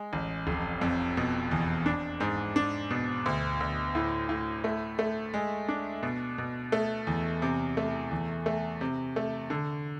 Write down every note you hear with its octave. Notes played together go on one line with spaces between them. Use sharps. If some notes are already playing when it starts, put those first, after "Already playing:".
Already playing: G#3
A1
F1
F2
B2
E2
D4
G#2
D4
B2
D2
D2
A2
A2
A3
A3
G#3
D4
B2
B2
A3
E2
C3
A3
E2
A3
C3
A3
D3